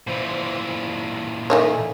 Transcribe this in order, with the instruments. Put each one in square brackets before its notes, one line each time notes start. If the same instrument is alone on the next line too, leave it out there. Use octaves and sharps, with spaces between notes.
[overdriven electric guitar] A#2 E3 [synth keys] C5
[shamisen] A#3 D#4 C#5 [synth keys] A4 E5 G#5